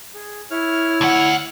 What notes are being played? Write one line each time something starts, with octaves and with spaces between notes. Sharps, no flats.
G#4
E4 C#5 F6
D2 F#5